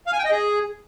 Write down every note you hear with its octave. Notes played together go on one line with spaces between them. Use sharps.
F5
G#5
G5
D#5
G#4